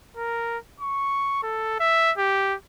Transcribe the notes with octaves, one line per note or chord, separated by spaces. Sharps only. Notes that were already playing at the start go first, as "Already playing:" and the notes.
A#4
C#6
A4
E5
G4